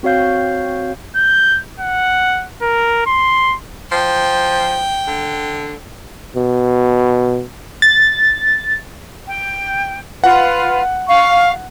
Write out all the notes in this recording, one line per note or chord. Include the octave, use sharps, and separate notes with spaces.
C4 F#4 C#5 F5 G6
G6
F#5
A#4
C6
F3 G5
D3
B2
A6
G5
F4 B4 F#5
F5 C#6